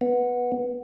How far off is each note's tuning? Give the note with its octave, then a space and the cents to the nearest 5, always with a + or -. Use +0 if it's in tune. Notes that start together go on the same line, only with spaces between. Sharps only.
B3 -10